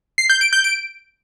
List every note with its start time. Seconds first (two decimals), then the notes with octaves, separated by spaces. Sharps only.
0.18 C7
0.30 G6
0.41 D7
0.53 G6
0.64 D7